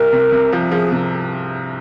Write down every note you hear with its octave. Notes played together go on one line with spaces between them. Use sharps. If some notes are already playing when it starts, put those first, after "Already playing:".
Already playing: C2 A#4
C3
C3
F3
F3 G#4
C3